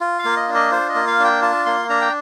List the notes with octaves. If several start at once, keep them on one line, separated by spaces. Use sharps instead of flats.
F4
F5
A#3
D#5
D4
D#5
F4 C5
D#5
A#3
F5
D4 G5
F4 A5
A#3 C6
D4 A#5
G5